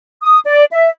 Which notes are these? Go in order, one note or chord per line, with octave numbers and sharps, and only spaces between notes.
D#6
D5
E5